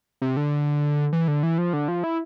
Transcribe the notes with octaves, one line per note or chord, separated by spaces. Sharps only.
C3
D3
E3
D3
E3
F3
D3
F3
E4